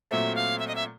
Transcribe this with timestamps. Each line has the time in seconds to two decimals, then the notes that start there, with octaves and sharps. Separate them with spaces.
0.11 A#2 F#3 A3 C4 E5
0.35 F5
0.59 E5
0.68 D#5
0.75 E5